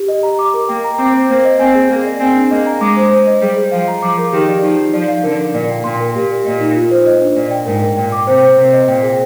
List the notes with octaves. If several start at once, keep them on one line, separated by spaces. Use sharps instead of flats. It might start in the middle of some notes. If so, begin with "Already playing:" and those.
Already playing: G4
D#5
A#5
D6
A#4
A#3 G5
A#5
C4 D6
C5
A#3 C5
D#5
C4 G#5
G#4
A#3 G#4
D5
C4 G#5
D4
A#3 D#5
A#5
G#3 D6
C5
C5
D#5
G3 G#4
G#4
F3 F5
A#5
F3 D6
A#4
D#3 G4
D5
F3 D#4
D#4
F3 D5
F5
D3 A#4
A#4
A#2 D5
G5
A#2 C6
A#4
A#2 G4
A#4
A#2 D#5
D#4
F4
C5
D#5
D4
A#2 D5
G5
G#2 A#4
A#4
A#2 G5
D6
C3 C5
C5
C3 C5
D#5
A#2 G5
G#4